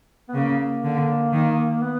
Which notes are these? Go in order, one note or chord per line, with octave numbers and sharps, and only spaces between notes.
B3
C#3 A#3
A#3
D3
D#3
B3